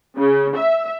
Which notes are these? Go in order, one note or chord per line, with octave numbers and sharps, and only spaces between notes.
C#3
E5